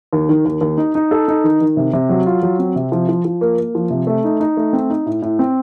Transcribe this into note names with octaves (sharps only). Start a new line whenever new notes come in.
D#2
D#3
D#2
D#2
D#4
D#4
A4
D#4
D#3
D#3
C3
C3
F#3
F4
F#3
C4
C3
F3
F3
F3
A#3
A#3
F3
C3
A3
D#4
D#4
A3
C4
D#4
A2
A2
C4